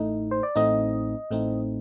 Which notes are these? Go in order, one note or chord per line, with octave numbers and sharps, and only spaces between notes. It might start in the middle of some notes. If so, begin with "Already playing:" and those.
Already playing: A1 A2 A3 D#4
C5
D5
A1 A2 A3 C4 D#4 D#5
A1 A2 A3 C4 D#4